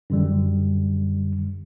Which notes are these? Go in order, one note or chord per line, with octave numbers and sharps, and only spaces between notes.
F#2 D3 G3